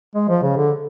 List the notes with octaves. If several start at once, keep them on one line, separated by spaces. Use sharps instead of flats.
G#3
F3
C#3
D3